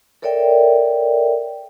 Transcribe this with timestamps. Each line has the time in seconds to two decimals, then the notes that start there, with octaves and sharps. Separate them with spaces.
0.22 A4 A#4 C#5 D5 E5 G5